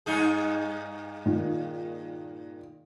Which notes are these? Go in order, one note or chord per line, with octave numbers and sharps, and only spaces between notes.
G2 D#4 G#4
A#2 D#3